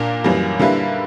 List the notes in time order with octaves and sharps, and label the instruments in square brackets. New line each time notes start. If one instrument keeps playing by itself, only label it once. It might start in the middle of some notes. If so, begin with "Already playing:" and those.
Already playing: [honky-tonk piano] A#2 A#3 D4 A#4
F#2 E3 G3 A#3
D3 G3 A#3 E4 B4